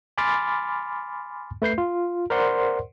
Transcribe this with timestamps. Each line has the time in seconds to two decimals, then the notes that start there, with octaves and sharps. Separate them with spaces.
0.18 G#5 B5 C6 D6 F6 A6
1.62 A3 B4 G6 C7
1.78 F4
2.30 A#4 C5 D5 F#5 C6